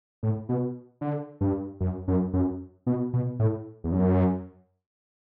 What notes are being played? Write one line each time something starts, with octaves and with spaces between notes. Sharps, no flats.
A2
B2
D3
G2
F#2
F#2
F#2
B2
B2
A2
E2
F#2